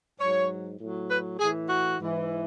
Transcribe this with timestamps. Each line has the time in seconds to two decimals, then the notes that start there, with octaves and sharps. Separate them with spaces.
0.19 G#2 F#3 C#5
0.79 A2 F#3
1.09 B4
1.39 A2 E3 G#4
1.69 F#4
1.99 G#2 E3